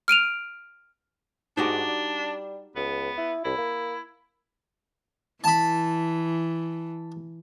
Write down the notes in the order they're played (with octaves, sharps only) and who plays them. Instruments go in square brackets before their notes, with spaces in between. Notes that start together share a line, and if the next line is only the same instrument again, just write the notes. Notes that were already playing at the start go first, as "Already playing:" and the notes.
[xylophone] F6 D7 D#7 F7
[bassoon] G#2 [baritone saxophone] D4 [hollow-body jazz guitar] D#4 F#4 G4
[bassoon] G3
[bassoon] C#2 [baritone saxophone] B3
[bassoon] E4
[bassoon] C2 [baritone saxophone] E4
[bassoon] A#3
[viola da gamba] E3 [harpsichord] A5 B5